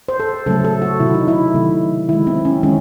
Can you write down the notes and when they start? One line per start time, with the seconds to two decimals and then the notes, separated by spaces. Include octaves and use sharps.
0.08 C5
0.20 A4
0.46 C#3 F#3 A3 A4
0.65 A4
0.82 F#4
1.00 C3 D#3 F#3 A3 E4
1.14 D#4
1.28 E4
1.54 C3 D#3 F#3 A3
2.09 D#3 G#3 E4
2.27 C4
2.45 C#4
2.63 D#3 G#3 C#4